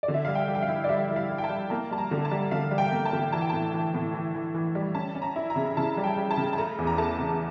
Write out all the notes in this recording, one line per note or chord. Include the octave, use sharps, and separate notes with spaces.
D5
D3
E5
G3 F5
G5
G3
G5
F5
E4
D5
G3 E5
G3
F5
E4
G5
A5
G3
A#3 A5
G3 A5
A#5
D3
A5
G3
D3 F5
G3
G5
A#3
A5
D3
E3 A5
G5
A2 A5
E3
A2
E3
E3
E3
G3
C#4 A5
C#4
A#5
E4
A#5
C#3
C#3 A5
G3
G5
G3
A5
C#3
A5
A3 A#5
E2
A#5
A3 A5
C#3